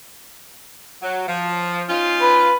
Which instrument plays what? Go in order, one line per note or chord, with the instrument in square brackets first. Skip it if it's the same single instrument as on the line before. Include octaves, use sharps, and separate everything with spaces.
[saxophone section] F#3
F3
C#4 D#4 F4
[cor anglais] B4